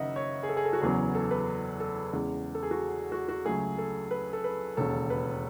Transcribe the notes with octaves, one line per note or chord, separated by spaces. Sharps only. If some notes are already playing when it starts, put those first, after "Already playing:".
Already playing: F#1 F#2 D#3 F#3 D#5 E5 F#5
C#5
G#4
A4
G#4
A4
F#4
F#1 E2 C#3 F#3 B3 G#4
A4
B4
A4
E2 C#3 G#3
A4
G#4
F#4
F#4
F#4
C#2 C#3 F#3 A3 G#4
A4
B4
A4
B4
E1 D#2 C#3 A4
B4